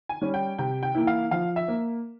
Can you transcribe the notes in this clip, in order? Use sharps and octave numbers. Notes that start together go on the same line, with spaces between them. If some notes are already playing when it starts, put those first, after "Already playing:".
G#5
G3 C#4
G5
C3 G5
G5
E3 A#3 E4
F5
F3 F5
E5
A#3